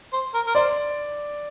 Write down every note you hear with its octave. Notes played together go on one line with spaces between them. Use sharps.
C5
A#4
A#4
C5 D5